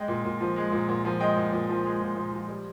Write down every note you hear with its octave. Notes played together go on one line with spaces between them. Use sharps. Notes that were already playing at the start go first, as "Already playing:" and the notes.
Already playing: G#3 D#5 G5
A#2
A#2
F3
G#3
A#2
A#2
F3
G#3 D#5 G5
A#2
A#2
F3
G#3
A#2
A#2
F3
G3